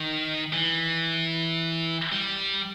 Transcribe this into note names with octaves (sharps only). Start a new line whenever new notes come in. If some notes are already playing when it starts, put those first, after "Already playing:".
Already playing: D#3
E3
G3